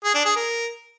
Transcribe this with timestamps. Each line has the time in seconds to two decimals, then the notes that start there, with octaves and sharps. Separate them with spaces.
0.04 G#4
0.15 D4
0.25 G#4
0.36 A#4